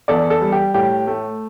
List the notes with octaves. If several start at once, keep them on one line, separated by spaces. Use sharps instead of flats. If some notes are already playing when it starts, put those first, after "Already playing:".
E2 A4 D5
A4
G3
G4
A2 G4
A3